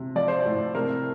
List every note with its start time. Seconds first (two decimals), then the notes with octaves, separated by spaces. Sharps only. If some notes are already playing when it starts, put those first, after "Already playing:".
Already playing: C3
0.15 F3 D5
0.28 C5
0.40 D5
0.46 A2
0.75 C3 A#4